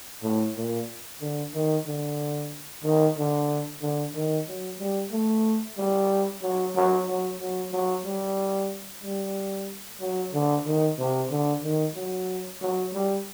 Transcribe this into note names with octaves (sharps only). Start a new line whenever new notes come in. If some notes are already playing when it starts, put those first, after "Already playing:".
A2
A#2
D3
D#3
D3
D#3
D3
D3
D#3
F#3
G3
A3
G3
F#3
F#3
F#3
F#3
F#3
G3
G3
F#3
D3
D#3
C3
D3
D#3
F#3
F#3
G3